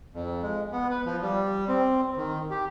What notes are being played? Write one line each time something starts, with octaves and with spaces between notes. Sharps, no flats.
F2
G#3
B3
B4
F3
G3
C4
D#3
G4